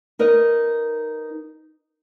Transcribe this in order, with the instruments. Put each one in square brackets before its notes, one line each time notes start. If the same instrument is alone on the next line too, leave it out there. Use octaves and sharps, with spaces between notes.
[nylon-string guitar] D#4 A#4 B4 D#5